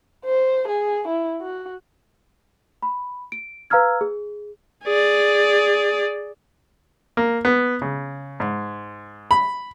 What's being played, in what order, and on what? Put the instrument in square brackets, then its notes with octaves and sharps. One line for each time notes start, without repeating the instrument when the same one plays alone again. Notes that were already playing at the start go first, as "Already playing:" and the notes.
[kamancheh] C5
G#4
E4
F#4
[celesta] B5
D7
B4 F5 A#5 E6 F6 G#6
G#4
[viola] G#4 D5
[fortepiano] A#3
B3
C#3
G#2
B5